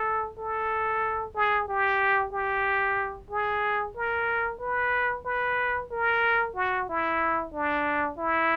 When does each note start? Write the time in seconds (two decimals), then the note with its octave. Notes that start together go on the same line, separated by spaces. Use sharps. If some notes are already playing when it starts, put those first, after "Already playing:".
Already playing: A4
0.38 A4
1.35 G#4
1.69 G4
2.33 G4
3.31 G#4
3.96 A#4
4.60 B4
5.25 B4
5.91 A#4
6.55 F#4
6.89 E4
7.54 D4
8.18 E4